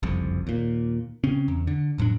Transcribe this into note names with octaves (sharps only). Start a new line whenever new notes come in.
F#1 C2 F2
D#2 A#2
C#3 C4 C#4
E2
D3
F1 A2 F#3 D4